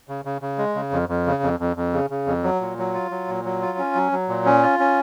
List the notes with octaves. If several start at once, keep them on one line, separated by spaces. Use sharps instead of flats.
C#3
C#3
C#3
G#3
C#3
F2
F2
C#3
F2
F2
F2
C#3
C#3
F2
F#3
A#2
F#3
F4
F#3
A#2
F#3
F4
C#4
F#3
F#3
A#2
C#4
F4
C#4